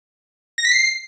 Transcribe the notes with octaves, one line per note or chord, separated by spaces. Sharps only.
A#6
B6
C7